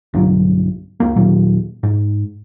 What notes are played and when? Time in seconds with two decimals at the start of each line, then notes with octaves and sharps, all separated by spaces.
0.14 B1 G2 D3 F#3
1.00 C#2 A#3
1.16 D#2 A#2 D#3 F#3
1.83 G#2